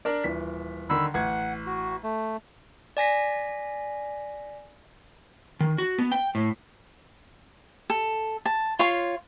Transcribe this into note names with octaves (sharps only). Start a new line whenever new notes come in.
D4 A#4 D5
D#1 E3 B6
D3 D#3 B5 E6
A1 F#5 G#6
F#4
A3
D5 G#5 A#6 B6
D#3
F#4
B3
G5
A2
A4
A5
F4 C#5 C6